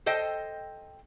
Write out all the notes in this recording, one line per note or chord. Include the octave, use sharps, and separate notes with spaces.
A4 C5 D#5 G5